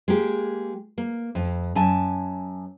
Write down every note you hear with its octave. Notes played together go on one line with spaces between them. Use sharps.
G#3 A#3 G4
A#3
F2
F#2 G#5 A5